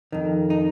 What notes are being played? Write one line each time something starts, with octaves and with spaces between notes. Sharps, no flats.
F2 D#3
D#4